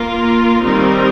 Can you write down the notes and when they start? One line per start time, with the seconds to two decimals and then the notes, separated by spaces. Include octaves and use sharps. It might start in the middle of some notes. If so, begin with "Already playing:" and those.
Already playing: A#3 F4 A#4
0.62 D#3 G3 C4 D#4 A#4